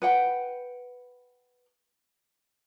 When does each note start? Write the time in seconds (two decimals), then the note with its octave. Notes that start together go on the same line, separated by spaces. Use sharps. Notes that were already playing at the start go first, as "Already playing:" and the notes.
0.02 B4 F#5 G5